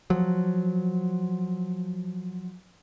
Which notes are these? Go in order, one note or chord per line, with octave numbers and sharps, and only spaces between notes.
F3 F#3